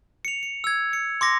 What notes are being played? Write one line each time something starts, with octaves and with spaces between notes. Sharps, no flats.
C#7 F7
C#7
E6 G#6
C#7
C6 D6 A#6